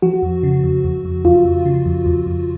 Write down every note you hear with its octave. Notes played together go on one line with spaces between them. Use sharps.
F3 F#4
F2
C#3
F2
F2
F2
F2 F4
F2
C#3
F2
F2
F2